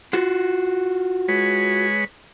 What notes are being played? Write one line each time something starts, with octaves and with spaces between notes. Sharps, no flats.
F4 F#4
G#3 B4 C#5